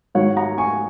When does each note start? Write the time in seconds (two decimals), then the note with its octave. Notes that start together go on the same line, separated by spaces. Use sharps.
0.15 G#2 D#3 F#3 C#5 F#5
0.36 F#5 A#5
0.58 G#5 C#6